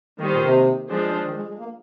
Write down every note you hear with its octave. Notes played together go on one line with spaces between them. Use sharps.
D#3 G3 A#3 D#4 G4 C5
A#2
C3
F3 G#3 D4 G#4 C5
D#3
G#3
G#3
A#3